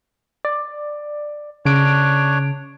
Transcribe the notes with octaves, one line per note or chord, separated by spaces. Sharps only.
D5
C#3 D4 C#5 D7